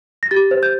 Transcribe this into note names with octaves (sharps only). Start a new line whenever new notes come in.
A#6
G4 A6
C5
G6